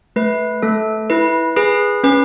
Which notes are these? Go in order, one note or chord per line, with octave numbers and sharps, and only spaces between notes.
A3 B4
A3 A4
E4 B4
G#4 B4
C#4 B4